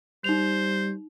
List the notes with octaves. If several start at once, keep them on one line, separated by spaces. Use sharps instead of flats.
G3 D#4 C5 F7